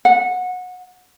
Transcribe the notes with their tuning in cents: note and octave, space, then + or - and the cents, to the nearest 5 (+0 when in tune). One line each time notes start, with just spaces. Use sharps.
F#5 -20